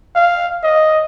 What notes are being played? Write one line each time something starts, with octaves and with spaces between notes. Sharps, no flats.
F5
D#5